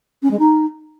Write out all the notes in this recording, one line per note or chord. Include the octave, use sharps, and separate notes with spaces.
C#4
G#3
D#4